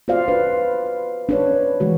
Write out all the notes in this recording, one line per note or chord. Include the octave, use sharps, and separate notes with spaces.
F4 F#4 C5 D5 F5
D4 B4
D4 B4 C#5
E3 G#3 F#4